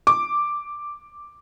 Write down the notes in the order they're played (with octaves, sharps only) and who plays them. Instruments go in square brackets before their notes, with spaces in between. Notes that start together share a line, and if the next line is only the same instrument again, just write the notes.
[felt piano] D6